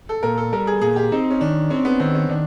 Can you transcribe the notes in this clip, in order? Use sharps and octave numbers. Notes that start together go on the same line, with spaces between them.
A4
A#2 A#4
A4
G3 A#4
G#4
A#2 G#4
G4
C4 D#4
C#4
D#3 D4
C4 C#4
B3
D#3 C4
C#4
D#3 D4